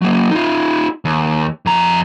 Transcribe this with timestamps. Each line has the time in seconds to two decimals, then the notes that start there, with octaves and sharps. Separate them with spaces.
0.02 F#3 A#3
0.31 D#4 F4
1.05 D#2
1.66 F2 A#5